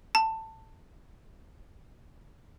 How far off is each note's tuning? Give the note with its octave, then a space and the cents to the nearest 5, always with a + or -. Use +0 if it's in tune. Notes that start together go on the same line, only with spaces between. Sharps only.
A5 +15